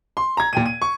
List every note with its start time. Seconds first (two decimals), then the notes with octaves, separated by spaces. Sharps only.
0.17 C6
0.37 A#5 G#6
0.53 A#2 G5 D#7
0.66 D#7
0.82 C#6